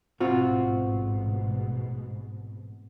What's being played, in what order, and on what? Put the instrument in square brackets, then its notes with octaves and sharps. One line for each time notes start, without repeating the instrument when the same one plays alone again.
[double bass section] A1 G#2 B2 [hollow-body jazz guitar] C4 F4 F#4